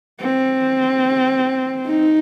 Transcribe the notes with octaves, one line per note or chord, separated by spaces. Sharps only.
C4
D#4